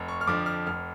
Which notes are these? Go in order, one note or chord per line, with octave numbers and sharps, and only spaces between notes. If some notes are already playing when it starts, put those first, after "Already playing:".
Already playing: F1
C#6
F6
F2 D3 F3 D6
F6
F1 F6